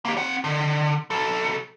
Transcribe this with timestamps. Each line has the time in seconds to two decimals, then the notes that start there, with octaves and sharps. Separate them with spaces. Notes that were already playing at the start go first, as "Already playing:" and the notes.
0.05 A#3 G4
0.17 C4 F#5
0.44 D3
1.10 B1 A4